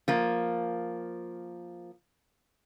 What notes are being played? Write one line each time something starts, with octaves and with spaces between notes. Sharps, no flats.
F3 A#3